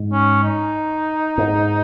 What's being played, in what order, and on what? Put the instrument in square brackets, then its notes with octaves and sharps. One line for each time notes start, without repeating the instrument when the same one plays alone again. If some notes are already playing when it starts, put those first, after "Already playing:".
Already playing: [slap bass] G#2
[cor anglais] C#4
D#4
[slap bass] G#2